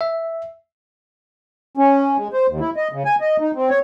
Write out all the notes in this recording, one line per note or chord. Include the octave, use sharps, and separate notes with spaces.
E5
C#4
G#3
C5
D#2
E4
D#5
C#3
G#5
D#5
D#4
C4
C#5